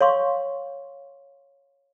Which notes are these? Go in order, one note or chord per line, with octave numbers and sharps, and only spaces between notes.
C#5 F5 C6 C#6